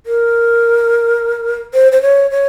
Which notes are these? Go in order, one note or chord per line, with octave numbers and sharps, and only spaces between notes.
A#4
C5
C5
C#5
C#5